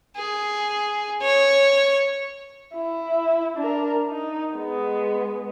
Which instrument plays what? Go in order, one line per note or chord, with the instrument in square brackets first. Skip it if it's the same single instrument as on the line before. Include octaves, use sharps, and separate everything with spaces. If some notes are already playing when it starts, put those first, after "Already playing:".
[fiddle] G#4
C#5
[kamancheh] E4
D4 A#4
D#4
G#3 B3